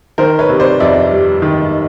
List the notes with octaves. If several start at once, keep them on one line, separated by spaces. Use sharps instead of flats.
D#3 A#4 C5
B4 C#5
C3
C5 D5
F2 D5 E5
G3
D#3